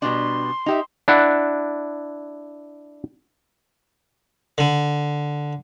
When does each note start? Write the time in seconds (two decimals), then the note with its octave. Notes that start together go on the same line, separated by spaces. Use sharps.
0.02 B2 G3 D4 C6
0.66 D#4 G4 E5
1.08 D4 E4 F#5
4.58 D3